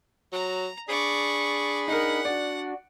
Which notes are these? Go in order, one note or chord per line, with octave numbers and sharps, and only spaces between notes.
F#3 A#5
D4 G#4 D5 B5 C#6
D#4 A#4 F#5
D4 F#4 D5